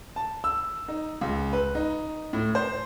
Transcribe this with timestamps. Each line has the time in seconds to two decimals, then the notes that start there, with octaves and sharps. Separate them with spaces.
0.16 A5
0.44 E6
0.88 D#4
1.21 C#2
1.53 B4
1.75 D#4
2.33 A2
2.55 C5